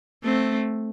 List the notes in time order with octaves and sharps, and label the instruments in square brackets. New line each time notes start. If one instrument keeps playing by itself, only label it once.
[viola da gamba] A3 C4